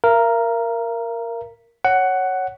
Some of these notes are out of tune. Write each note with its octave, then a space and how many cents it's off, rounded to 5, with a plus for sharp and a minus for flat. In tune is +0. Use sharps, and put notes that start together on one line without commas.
A#4 +0 F5 -45
C#5 +0 F#5 +10